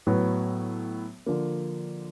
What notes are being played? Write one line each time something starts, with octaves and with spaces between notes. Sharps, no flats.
A2 F#3 B3
D3 F3 A#3